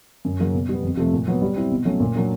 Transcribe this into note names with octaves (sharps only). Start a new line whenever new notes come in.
F#2
C#3 F#3 A#3
B2
G3 B3
F2
C3 F3 A3
A#2
F#3 B3
G3
C4 E4
B2
F#3 A3 C#4
A#2
F#3 A#3 D4